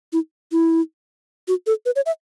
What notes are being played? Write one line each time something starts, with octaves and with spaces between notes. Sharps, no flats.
E4
E4
F#4
A4
B4
C#5
E5